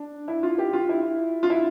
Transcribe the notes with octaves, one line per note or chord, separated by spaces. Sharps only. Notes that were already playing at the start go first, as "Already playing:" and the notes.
Already playing: D4
E4
F4
G4
F4
E4
F4
E4